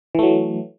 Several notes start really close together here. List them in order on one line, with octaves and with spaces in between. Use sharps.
E3 A3 F#3